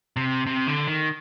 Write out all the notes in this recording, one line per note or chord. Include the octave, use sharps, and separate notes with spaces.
C3
C3
D3
D#3